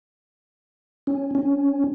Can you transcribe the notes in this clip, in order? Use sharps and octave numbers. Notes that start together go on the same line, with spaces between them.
C#4
C#4